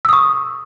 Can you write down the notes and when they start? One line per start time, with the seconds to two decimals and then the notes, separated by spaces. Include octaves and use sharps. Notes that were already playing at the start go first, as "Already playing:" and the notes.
0.05 E6
0.09 D#6
0.13 C#6